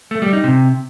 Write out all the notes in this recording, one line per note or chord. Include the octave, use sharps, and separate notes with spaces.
A3
G3
D#4
C3